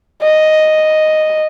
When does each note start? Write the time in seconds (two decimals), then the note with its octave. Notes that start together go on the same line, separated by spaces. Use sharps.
0.22 D#5